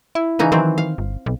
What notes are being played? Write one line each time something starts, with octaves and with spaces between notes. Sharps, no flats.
E4
C#3 E3 D#4
D#3 E3 F#3 C4
F5
G1
B1